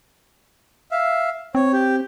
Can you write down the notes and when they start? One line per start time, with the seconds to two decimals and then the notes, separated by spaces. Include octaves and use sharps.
0.91 E5 F5
1.55 C4 C#5
1.73 G4